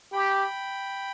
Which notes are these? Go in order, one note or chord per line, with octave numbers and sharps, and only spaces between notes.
G4 G5 B5